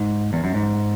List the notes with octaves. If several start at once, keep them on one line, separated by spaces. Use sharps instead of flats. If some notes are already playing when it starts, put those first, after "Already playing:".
Already playing: G#2
E2
F#2
G#2